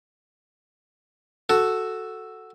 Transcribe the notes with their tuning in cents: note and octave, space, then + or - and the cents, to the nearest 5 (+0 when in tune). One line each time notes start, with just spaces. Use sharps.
F#4 +0 A4 +0